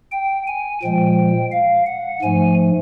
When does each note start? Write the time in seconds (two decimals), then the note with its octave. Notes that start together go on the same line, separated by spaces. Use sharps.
0.12 G5
0.47 G#5
0.83 A#2 F3 G#3 G5
1.52 F5
1.87 F#5
2.22 G#2 F3 A3 G#5